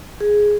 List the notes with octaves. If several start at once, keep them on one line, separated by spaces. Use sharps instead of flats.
G#4